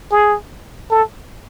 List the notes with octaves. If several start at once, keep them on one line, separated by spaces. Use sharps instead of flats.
G#4
A4